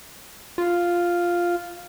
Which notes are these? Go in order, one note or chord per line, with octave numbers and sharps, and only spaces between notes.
F4